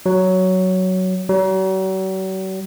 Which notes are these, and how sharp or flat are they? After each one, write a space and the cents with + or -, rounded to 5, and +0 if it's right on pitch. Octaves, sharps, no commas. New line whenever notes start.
F#3 +10
F#3 +45